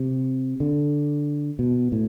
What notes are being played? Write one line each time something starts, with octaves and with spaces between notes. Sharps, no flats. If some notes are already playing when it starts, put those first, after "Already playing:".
Already playing: C3
D3
B2
A2